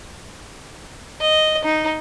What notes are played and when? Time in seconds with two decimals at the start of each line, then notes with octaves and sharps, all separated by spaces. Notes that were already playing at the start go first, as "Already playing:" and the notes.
1.21 D#5
1.64 D#4